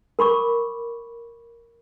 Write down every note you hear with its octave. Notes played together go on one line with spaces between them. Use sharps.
A#4 B5 C#6 D6